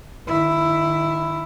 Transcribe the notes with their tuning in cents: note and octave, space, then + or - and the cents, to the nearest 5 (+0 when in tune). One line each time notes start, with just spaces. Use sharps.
D#3 -25 E4 +5